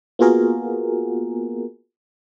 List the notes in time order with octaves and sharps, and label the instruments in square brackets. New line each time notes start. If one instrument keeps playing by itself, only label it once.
[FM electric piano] A#3 B3 F4 F#4 G#4 A#4